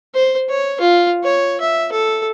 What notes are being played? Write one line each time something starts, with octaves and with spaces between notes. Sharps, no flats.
C5
C#5
F4
C#5
E5
A4